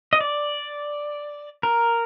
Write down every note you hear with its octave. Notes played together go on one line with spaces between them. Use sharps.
D#5
D5
A#4